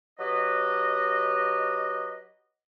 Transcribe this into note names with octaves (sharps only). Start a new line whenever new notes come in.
F#3 G4 B4 D#5